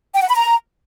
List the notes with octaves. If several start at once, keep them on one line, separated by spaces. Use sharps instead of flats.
G5
F#5
B5
A#5